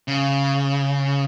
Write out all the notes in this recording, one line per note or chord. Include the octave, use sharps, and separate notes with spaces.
C#3